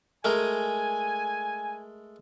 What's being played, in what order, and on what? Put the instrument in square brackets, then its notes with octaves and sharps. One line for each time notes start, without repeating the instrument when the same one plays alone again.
[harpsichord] G#3 A3 A#4 [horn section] G#5